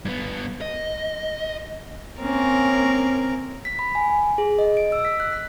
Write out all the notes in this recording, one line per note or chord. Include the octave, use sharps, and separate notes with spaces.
G2 B3
D#5
A#3 C4 C#4 A#4
B6
B5
G#5
G#4
D#5
D7
E6
B6
F#6
B6